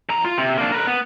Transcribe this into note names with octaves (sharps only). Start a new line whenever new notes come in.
E2 A#5
F4
C3
A#3 D4
A#4 B4
B3